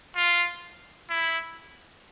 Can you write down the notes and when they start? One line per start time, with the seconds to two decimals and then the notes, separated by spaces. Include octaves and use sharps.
0.16 F4
1.10 E4